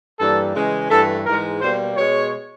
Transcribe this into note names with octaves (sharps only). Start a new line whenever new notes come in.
G2 E3 G3 A#3 A4
C#3 E3 G#3
G2 E3 A3 A4
G#2 E3 G#3 A#4
B2 G3 A#3 C5
B2 G#3 C#5